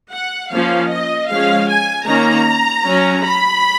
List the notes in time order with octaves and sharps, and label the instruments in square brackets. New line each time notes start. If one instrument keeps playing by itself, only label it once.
[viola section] F#5
F3 A#3 C#4 F5
D#5
F3 G#3 C#4 F5
G#5
D#3 A#3 C#4 A#5
F#3 C#4
B5